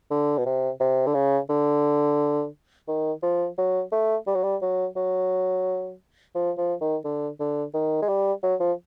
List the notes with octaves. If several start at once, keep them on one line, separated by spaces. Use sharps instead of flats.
D3
B2
C3
C3
D3
C#3
D3
D#3
F3
F#3
A3
G3
F#3
G3
F#3
F#3
F3
F3
D#3
D3
D3
D#3
G#3
G3
F#3
F3